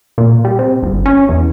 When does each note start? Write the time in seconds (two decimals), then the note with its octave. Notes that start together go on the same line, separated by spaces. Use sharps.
0.18 A#2
0.45 G3
0.59 C3
0.83 G1
1.06 C#4
1.29 E2